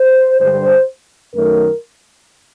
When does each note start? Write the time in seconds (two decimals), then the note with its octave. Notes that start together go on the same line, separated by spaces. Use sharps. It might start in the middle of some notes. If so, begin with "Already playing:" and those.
Already playing: C5
0.40 G2 D3 G3 C5
1.34 F#2 D#3 F#3 A3 A#4